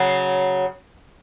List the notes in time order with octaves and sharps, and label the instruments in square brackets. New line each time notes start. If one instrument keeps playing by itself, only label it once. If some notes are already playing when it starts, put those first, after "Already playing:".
Already playing: [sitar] C#3 F#3